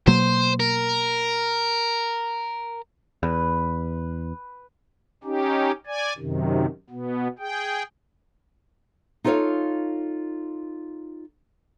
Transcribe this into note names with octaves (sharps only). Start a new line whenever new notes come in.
B2 F#3 A#3 C5
A#4
E2 B4
C#4 D#4 G4
D5 G#5
F#2 C3 D#3
B2 B3
G#4 G5
D#4 F4 A4 B4 C#5 F5